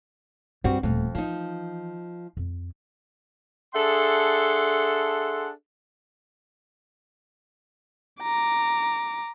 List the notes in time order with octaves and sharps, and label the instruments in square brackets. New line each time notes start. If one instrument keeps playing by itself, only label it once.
[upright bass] G2 [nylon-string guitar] G3 C4 F#4
[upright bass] D#1 A3 [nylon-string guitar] F2
[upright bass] E3 [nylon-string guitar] F3 D#4
[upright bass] F2
[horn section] D4 G#4 A4 E5 F#5 C6
[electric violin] A#5 D6